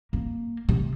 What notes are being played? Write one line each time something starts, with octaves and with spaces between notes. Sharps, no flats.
A#3
C3